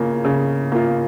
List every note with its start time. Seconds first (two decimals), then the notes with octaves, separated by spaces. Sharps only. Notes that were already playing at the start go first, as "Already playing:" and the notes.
Already playing: C#3 A#3 F4
0.25 C#3
0.72 A#3 F4